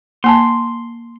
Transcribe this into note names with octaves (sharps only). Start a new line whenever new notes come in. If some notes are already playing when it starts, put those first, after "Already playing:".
A#3 G#5 A5 C6